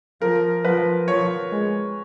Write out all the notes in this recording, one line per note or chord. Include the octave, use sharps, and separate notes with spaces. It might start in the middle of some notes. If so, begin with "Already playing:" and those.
F3 A#4
F3 B4
F3 C#5
G#3